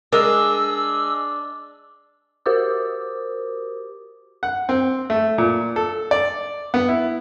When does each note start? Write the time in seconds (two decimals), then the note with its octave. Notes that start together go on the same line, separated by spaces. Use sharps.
0.12 G#3 D4 G#4 A#4 D#5 E6
2.46 F#4 G4 A#4 C5 D6 D#6
4.43 F#5
4.69 C4
5.10 A3
5.38 A#2
5.76 A4
6.11 D5
6.74 B3
6.89 E4